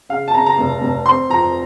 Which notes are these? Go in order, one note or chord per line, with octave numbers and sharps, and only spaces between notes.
C#3 F5
A5
C#3 A#5
A#5
F1
F1
C4 C6
F2 A#5